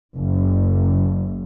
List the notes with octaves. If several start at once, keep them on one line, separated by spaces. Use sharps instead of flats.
F#1